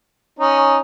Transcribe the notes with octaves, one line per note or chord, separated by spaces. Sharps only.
C#4 D#4